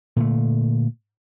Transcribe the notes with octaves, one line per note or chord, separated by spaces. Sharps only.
A#2 D3 A3